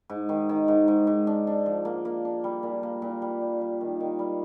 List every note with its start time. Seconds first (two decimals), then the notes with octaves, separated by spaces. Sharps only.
0.09 G#2
0.29 D#3
0.49 D#3
0.68 G#2
0.88 G#2
1.07 G#2
1.27 D4
1.47 D4
1.66 F3
1.85 A#3
2.05 A#3
2.25 D4
2.44 G3
2.63 A#2
2.83 A#3
3.02 A#2
3.22 G3
3.41 G3
3.61 G3
3.81 D#3
4.00 D#3
4.19 G3